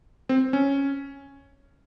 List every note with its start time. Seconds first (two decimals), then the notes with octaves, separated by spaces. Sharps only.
0.29 C4
0.53 C#4